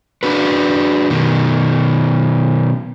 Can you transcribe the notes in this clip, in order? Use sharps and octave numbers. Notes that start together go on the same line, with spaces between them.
D4 F#4 B4
B2 D#3